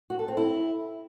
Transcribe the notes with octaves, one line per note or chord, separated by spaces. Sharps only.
F#4
A4
C4
E4